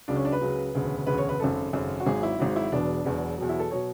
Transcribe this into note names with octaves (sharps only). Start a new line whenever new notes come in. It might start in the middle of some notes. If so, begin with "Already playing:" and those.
C#2 C#3 F#3 D4
C#4
D4
B4
C#2 C#3 F#3
E1 D2 C#3
E1 D2 C#3 B4
C#5
B4
G#1 F#2 C#3 A4
G#1 F#2 C#3
F#4
G#1 G#2 F#3 G#4
E4
G#1 G#2 F#3
E4
E1 E2 B2 F#3 D4
E1 E2 B2 F#3
E2 B2 F#3
E4
A4
B2 F#3 C#5